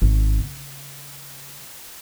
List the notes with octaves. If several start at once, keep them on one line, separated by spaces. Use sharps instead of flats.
G#1
C#3